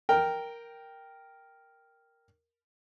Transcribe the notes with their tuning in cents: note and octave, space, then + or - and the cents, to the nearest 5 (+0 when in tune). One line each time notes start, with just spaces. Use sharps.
A#4 +0 G5 +0